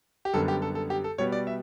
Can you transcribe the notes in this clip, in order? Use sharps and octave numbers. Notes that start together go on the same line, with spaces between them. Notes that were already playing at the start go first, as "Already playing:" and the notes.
G4
F#2 D3 G3 B3 A4
G4
A4
A4
G4
A4
B2 G3 B3 C#5
D5
E5